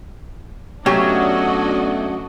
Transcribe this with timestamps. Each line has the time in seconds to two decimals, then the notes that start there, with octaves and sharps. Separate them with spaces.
0.86 F#3 A3 B3 C#4 D4 F#4 G4 D#5